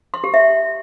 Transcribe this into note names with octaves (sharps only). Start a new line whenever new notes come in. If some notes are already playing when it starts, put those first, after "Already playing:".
C6
G4
E5